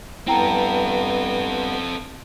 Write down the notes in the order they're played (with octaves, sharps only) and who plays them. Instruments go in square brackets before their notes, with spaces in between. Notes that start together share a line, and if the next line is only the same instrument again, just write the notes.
[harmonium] G2 B3 [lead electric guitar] C4 A4 [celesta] E4 G5 A#5